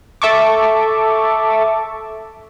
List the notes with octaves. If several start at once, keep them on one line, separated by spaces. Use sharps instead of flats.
A4 E5 A5 C#6 D6